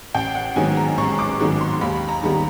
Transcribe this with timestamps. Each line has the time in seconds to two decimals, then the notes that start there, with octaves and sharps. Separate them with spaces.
0.14 A1 G5
0.35 F#5
0.56 G#2 D#3 F#3 B3 G#5
0.77 A#5
0.98 A1 C#6
1.19 D6
1.40 G#2 D#3 F#3 B3
1.61 C6
1.81 D#2 B5
2.09 A#5
2.23 D#3 G3 B3